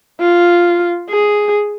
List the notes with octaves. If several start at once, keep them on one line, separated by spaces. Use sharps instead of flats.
F4
G#4